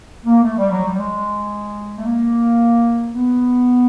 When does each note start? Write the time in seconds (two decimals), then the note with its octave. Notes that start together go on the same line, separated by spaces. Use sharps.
0.25 A#3
0.43 A3
0.57 G3
0.71 F#3
0.84 G3
0.97 G#3
1.97 A3
2.05 A#3
3.14 B3